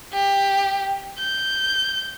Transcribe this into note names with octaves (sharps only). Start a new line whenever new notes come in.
G4
G6